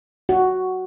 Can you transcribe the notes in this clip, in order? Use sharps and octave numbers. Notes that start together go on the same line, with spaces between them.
F#4